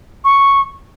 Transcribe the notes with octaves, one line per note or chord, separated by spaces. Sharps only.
C#6